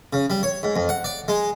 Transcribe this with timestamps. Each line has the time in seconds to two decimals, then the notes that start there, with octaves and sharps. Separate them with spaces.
0.13 C#3
0.30 G3
0.43 C#5
0.63 G#2
0.76 F2
0.89 F#5
1.04 D5
1.28 G#3